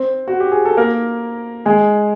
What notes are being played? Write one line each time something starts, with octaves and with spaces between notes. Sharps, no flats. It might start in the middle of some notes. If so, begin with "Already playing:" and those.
Already playing: C4 C5
F#4
G4
G#4
A4
A#3 A#4
G#3 G#4